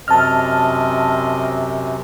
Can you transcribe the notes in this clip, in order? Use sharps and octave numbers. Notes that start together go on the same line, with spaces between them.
F#2 C3 C4 D#5 A5 F6